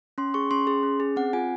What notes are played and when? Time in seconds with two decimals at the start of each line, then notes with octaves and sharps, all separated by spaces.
0.18 C#4 C6
0.34 G#4 C#6
0.51 C#4 C6
0.67 G#4
0.83 C#4
1.00 G#4
1.16 C4 F#5
1.33 F4 G#5